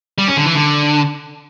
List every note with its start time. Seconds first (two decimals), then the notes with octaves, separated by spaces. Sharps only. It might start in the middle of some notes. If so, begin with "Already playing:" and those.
0.18 G3
0.27 C#4
0.37 D3
0.46 E3
0.55 D3